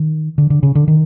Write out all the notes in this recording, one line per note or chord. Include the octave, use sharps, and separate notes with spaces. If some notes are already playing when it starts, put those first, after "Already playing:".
Already playing: D#3
D3
D3
C#3
D3
D#3